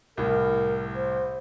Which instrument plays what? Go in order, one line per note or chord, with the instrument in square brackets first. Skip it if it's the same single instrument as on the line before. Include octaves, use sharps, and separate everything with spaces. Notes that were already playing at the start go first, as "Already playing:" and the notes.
[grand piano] C2 A2 [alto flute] A#4
[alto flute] C5